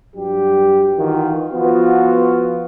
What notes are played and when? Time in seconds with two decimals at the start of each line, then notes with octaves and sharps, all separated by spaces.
0.16 G2 F#3 G3 G4
0.98 D#3 E3 D#4 F4 F#4
1.53 F3 B3 F4 F#4